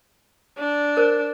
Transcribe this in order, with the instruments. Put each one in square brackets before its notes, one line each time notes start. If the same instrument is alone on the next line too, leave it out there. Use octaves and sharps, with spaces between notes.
[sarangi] D4
[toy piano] A#4 C5